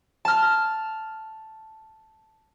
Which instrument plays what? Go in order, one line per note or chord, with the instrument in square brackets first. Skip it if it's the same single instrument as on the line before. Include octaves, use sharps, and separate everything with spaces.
[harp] A5 F6